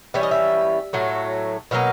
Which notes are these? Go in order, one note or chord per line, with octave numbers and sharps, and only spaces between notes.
E3 G3 C#4 E5
D#5
E5
A2 F#3 A3
B2 F#3 A#3 D#4 F5